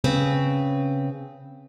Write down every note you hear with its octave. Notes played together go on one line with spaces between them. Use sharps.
C#3 C4 B4